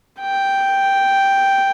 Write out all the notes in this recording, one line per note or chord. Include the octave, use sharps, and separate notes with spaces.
G5